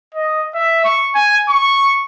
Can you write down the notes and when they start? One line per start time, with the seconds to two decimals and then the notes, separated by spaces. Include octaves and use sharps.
0.14 D#5
0.54 E5
0.85 C#6
1.15 G#5
1.49 C#6